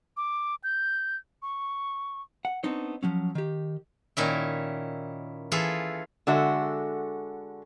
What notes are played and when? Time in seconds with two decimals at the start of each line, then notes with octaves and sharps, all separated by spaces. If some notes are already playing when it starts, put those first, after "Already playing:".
0.17 D6
0.64 G6
1.42 C#6
2.45 F#5
2.64 B3 C4 D4 D#4 C#5
3.03 F3 F#3 C#4
3.35 D#3 G4
4.17 A#2 D#3 C#4 E4
5.52 E3 F4 G#4 A4
6.27 D3 G#3 F#4 A4 E5